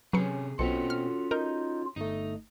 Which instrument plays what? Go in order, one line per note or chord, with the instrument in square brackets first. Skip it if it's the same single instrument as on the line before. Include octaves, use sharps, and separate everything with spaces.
[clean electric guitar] C3 G#4 [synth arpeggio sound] F#3 B4 C#7 [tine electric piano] C#4
[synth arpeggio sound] B1 [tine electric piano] B2 C4 C#7 [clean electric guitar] C#4 F#4 A4 [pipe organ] F4
[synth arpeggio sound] F6
[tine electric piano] D#4 G6 [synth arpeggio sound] A#4
[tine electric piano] G1 A3 [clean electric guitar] D#4